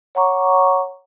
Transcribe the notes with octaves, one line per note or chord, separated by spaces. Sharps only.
C#5 F#5 A#5 C#6 D6